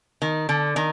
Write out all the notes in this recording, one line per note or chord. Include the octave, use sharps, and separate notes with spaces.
D#3
D3
D#3